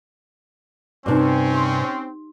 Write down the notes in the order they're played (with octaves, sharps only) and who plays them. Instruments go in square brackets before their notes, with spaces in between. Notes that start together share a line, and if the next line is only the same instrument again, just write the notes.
[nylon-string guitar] G2 C3 [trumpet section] C4 C#4 [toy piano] D#4 C5 D6
[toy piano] G4 C6